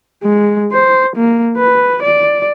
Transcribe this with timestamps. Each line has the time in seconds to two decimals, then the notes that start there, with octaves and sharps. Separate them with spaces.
0.23 G#3
0.72 C5
1.16 A#3
1.57 B4
2.02 D5